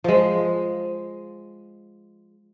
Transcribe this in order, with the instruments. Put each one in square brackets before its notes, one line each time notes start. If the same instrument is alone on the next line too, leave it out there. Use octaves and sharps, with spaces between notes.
[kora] F3 G#3